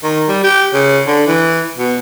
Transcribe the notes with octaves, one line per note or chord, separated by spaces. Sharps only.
D#3
G3
G4
C#3
D3
E3
B2